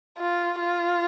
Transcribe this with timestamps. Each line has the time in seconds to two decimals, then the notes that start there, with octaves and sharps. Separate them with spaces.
0.18 F4
0.60 F4